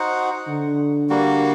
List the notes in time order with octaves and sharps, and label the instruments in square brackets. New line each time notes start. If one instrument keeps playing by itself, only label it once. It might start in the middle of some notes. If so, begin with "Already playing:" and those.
Already playing: [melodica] D#4 F#4 C5 F#5
[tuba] D3
[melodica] G3 A#3 F#4